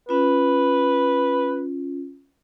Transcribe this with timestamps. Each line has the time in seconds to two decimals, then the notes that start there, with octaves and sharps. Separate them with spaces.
0.09 C#4 F4 B4